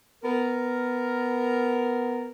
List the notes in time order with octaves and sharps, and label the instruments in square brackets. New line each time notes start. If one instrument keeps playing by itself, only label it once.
[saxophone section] B3 A#4